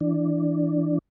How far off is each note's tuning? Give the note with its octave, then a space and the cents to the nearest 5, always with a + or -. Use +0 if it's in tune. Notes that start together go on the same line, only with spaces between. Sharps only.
E3 +0 D4 +0